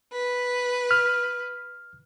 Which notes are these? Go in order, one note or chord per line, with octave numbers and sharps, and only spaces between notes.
B4
F6